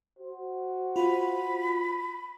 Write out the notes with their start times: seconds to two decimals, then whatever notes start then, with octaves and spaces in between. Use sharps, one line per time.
0.19 F#4 C5
0.96 F4 B5